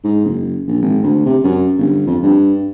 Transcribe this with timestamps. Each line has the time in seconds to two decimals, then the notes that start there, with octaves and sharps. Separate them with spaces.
0.04 G#2
0.25 F#1
0.67 A#1
0.82 G#1
1.03 D2
1.26 C3
1.44 F#2
1.78 G1
2.06 F2
2.23 G2